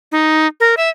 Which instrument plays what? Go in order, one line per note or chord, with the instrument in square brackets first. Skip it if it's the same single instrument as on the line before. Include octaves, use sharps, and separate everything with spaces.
[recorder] D#4
A#4
E5